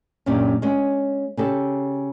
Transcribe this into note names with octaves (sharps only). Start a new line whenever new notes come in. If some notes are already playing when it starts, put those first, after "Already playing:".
F#2 A#2 C#4 D4 G4
G#3 C#4
C#3 G4 A4